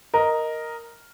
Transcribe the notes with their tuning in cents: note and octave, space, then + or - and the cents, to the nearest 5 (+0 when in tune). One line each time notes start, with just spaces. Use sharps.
A#4 +0 D#5 +0